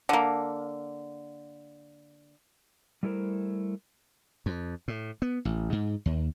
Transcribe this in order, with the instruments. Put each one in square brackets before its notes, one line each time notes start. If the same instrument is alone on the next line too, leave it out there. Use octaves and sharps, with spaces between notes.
[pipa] D3 A#3
[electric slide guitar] G3 A3 E4 A4 A#4 C5
[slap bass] F2
A2
B3
A1
G#2
D#2